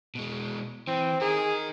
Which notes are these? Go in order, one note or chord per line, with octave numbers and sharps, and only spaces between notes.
B2 G#3
E3 C4
D#4 G#4 A#4